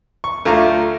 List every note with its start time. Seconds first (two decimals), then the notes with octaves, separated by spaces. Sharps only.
0.24 C#6
0.45 D2 A3 F4 A#5